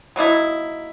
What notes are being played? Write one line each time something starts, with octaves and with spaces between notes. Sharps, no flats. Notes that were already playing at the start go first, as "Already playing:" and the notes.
F#3 A#3 D#4 E4